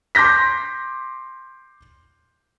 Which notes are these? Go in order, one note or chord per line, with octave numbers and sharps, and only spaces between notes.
C6 D6 G6 A#6 B6